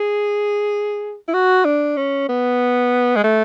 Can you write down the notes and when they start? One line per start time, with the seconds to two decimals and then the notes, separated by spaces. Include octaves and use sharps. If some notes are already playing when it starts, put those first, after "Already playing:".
Already playing: G#4
1.28 E4
1.34 F#4
1.65 D4
1.97 C#4
2.29 B3
3.16 G#3
3.24 A3